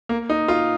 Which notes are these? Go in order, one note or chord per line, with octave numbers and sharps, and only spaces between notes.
A#3
D#4
F4